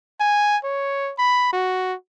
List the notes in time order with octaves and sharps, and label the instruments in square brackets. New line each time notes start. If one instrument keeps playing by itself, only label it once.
[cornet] G#5
C#5
B5
F#4